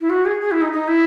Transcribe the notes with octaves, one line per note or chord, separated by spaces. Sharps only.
E4
F#4
G#4
G#4
E4
D#4
D#4
E4